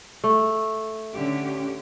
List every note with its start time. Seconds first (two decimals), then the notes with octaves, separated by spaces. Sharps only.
0.24 A3
1.15 D3 C#4 G4